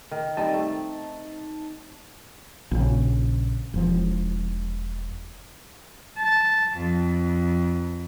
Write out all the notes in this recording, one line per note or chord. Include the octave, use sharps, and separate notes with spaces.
D#3
G3 C4 D#4 D#5 A5
A3
A#1 C#3
E1 F3
A5
F2